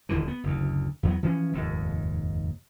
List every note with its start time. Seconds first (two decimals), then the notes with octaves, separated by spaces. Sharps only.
0.09 D#1 D#2 D3 E3
0.28 B3
0.43 F#1 D2
1.03 E2 F#3 B3
1.23 E3 F3 B3 C#4
1.53 F1 D#2 G#2